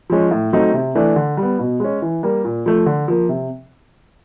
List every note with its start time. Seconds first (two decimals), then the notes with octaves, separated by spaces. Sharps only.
0.10 F3 G#3 C#4
0.31 A2
0.53 F#3 A3 C4 D#4
0.74 C3
0.95 E3 A3 D4
1.16 D3
1.37 G3
1.43 B3
1.59 B2
1.80 G#3 C#4
2.02 E3
2.23 G3 A#3
2.45 A#2
2.66 F3 A3
2.86 D3
3.08 F3 A#3
3.29 C3